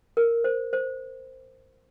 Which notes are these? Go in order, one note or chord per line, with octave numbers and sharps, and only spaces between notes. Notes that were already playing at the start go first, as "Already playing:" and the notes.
A#4
C5
C5